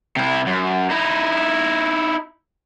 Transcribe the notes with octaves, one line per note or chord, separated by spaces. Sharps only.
C3 E4
F#2
D#4 E4